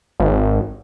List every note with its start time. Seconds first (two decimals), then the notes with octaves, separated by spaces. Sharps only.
0.20 G#1